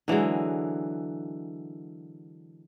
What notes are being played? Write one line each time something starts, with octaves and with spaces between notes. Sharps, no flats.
D3 E3 F#3 G#3